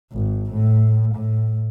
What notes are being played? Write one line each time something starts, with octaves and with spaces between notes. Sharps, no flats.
G#1
A2
A2